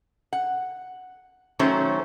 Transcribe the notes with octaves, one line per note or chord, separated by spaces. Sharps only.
F#5
D#3 F#3 A3 C#4 C5